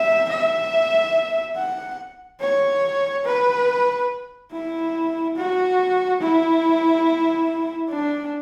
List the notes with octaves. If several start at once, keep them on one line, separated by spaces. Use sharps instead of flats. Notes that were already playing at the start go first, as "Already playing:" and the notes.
Already playing: E5
E5
F#5
C#5
B4
E4
F#4
E4
D4